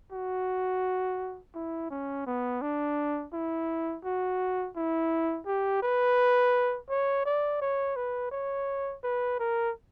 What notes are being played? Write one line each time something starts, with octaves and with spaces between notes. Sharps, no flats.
F#4
E4
C#4
B3
D4
E4
F#4
E4
G4
B4
C#5
D5
C#5
B4
C#5
B4
A#4